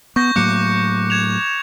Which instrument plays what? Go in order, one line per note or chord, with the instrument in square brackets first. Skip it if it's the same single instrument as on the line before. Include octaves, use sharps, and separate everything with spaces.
[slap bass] B3 [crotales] C#6 G6 A#6
[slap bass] A2 F#3 A#3 [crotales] D6 F#6 C#7
[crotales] G#6 E7 F7